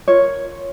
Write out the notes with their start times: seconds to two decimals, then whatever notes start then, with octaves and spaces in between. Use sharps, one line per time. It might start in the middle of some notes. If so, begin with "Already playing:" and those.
0.08 F4 A#4 C#5